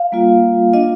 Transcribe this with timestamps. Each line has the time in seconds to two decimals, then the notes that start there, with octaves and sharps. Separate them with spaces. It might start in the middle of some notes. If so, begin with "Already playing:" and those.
Already playing: F5
0.12 G3 A#3 F4
0.72 A#3 D4 F4 D#5